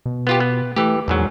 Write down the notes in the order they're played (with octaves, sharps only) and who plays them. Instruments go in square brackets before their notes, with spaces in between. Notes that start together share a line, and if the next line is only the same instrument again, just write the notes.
[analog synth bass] B2
[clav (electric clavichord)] B3 F4 G4
B3
[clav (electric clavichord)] E3 G4 [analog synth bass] A3
[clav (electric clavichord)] A#1 G#2 F#3 [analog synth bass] E2